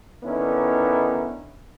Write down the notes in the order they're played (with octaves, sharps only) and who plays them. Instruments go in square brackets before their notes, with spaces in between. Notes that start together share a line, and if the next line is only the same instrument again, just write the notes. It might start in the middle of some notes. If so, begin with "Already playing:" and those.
[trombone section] D3 D#3 B3 C#4 D#4 E4